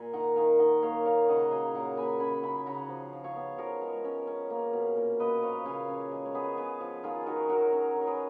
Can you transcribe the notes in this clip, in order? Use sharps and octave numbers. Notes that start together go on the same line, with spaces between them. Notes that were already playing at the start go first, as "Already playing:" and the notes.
Already playing: A#2 G#5
D#3 F#5 A#5
D#3 F5 G#5
D#3 D#5 F#5
A#3 C#5 F5
A#3 C#5 F5
C#3 D#5 F#5
F#3 F5 G#5
A#2 F#5 A#5
A#3 G#5 B5
C#3 G#5 B5
C#3 G#5 B5
C#3 F#5 A#5
F3
F3
C#5 F5
B3
F3 A#4 C#5
G#3
C#4
C#4
A#3
B2
A#2
A#3 B4 D#5
F3 C#5 F5
C#3 F5 G#5
C#4
G#3
C#5
B3 G#4 B4
B3 G#4 B4
F3
D#3 F4 G#4
D#3 F#4 A#4
F#3 F#4 A#4
C#4
D#3
A#4
G#4 B4